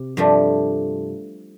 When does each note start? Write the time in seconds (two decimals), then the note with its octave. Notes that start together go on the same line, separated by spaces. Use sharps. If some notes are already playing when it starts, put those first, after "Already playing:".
Already playing: C3
0.17 G2 F3 A3